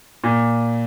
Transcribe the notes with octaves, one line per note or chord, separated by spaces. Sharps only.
A#2